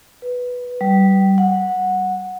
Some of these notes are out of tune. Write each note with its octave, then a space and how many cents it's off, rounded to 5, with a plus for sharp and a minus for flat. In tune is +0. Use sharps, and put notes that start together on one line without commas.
B4 +0
G3 -25
F#5 -10